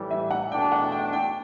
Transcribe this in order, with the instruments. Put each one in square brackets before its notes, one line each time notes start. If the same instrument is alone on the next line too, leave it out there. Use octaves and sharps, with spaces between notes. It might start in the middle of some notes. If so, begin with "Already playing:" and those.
Already playing: [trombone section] A2 E3 G3
[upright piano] E5
F#5
[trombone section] E2 B2 A3 D4 [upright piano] G5
[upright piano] F#5
G5
G5